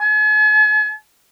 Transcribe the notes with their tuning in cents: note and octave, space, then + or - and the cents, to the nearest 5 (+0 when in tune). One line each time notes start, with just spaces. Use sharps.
G#5 +45